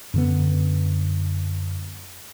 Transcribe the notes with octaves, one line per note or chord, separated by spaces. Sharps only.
F#2 D3 B3